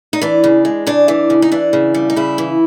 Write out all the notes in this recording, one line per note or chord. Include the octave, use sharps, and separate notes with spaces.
D#4
E3 D4
C#3
G#3
C#3 D4
E3
C#3
D#4
E3 D4
C#3
G3
D#4
C#3 E4
E3